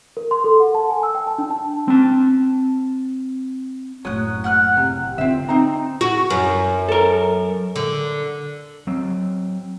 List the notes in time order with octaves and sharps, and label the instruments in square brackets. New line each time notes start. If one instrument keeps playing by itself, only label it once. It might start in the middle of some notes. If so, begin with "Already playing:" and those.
[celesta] A#4
C6
A4
F#5
A5
G#5
E6
G5
A5
D4
A5
[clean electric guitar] C4 A5
[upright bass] F#1 A2 [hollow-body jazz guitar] F#3 [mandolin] D#6 F#6
[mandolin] F#5 F6 F#6
[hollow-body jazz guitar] C3
[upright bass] D3 F4 [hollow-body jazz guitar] C4 E5
[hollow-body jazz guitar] C4 D#4 A#5
[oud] F#4
F#2
[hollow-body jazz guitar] A4 A#4
[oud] D3
[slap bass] F#3 C4